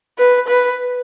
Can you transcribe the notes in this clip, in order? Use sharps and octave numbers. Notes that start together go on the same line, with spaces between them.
B4
B4